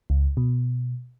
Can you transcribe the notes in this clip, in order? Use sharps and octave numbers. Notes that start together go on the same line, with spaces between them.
C#2
B2